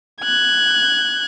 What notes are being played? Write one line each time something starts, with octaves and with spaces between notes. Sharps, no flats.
F#6 G#6